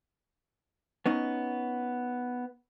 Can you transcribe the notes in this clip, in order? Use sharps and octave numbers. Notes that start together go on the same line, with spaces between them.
B3 C#4 D#4